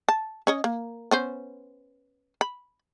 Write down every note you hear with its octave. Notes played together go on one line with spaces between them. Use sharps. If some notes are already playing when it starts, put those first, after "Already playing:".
A5
C#4 C#5 D#5
A#3
B3 C#4 C5
B5